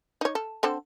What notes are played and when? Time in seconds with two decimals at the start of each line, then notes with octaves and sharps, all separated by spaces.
0.21 D#4 C#5
0.35 A4
0.63 D3 C4 A4